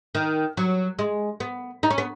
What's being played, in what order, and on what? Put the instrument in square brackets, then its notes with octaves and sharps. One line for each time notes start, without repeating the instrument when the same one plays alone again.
[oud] D#3
F#3
G#3
B3
D#4
C#4
B3